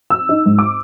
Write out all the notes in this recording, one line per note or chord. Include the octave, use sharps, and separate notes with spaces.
E6
D#4
G#2
D6